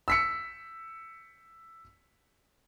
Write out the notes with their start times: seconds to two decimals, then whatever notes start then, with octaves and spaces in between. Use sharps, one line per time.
0.08 E6 B6 C#7